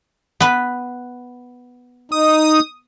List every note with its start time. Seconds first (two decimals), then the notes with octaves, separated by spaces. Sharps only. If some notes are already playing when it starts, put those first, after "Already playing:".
0.40 B3 B4
2.12 D#4 D#6